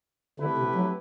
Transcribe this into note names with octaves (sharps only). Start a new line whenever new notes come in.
D3 A3 C4 E4 G4 B4
C3
F#3